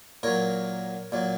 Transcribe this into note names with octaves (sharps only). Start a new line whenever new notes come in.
A#2 F#3 A#4 C#5
A#2 F#3